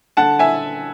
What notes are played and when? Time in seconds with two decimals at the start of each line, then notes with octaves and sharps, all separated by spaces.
0.17 D3 F#5 A5
0.39 E5 G#5